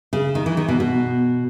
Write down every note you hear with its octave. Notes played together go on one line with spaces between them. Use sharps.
C#3
D#3
E3
D#3
B2
B2